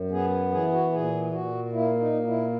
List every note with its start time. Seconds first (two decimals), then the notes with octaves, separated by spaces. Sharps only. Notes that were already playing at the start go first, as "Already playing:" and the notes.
Already playing: F#2
0.11 B3 G#4
0.51 E3 G#4
0.73 F#4
0.92 A#2 G#4
1.32 A#2 F#4
1.72 A#3 E4
1.99 D#4
2.13 A#2
2.27 E4